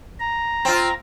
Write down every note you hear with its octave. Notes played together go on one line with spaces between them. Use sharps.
A#5
C4 F4